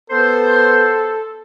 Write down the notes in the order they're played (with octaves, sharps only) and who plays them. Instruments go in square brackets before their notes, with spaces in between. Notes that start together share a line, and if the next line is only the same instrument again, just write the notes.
[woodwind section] B3 C5 [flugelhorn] A4